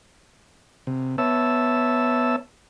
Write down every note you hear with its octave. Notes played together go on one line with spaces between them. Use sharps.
C3
B3 C#5 E5 A5 E6